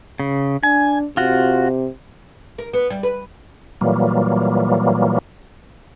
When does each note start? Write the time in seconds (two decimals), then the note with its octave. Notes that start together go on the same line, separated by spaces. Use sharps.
0.20 C#3
0.63 D4 G#5
1.17 C3 F4 F#4
2.58 A#4
2.73 B3
2.90 G3
3.03 B4
3.81 A#2 E3 F#3 G3 A#3